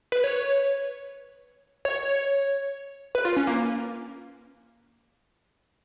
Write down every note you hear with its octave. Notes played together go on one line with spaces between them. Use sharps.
B4
C#5
C#5
B4
F4
C#4
A#3